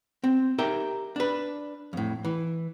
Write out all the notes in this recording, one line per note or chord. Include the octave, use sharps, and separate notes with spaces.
C4
D#4 G4 A#4 E5 G5
D4 B4
F2 A2
E3